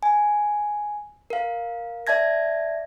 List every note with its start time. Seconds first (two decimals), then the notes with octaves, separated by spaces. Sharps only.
0.03 G#5
1.30 A#4 F5
2.07 D5 E5 A5 G#6 A#6